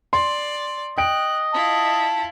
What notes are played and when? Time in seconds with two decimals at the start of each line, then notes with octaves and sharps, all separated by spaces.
0.13 D5 C6
0.98 D#5 G5 F#6 D7
1.54 E4 F4 A5